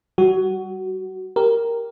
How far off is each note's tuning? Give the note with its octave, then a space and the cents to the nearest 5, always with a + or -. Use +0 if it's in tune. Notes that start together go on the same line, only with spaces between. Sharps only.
G3 -20 F#4 +15
G4 +0 A#4 +0